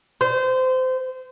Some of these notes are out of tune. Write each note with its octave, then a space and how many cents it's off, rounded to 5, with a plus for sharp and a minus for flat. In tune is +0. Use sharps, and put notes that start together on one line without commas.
C5 -25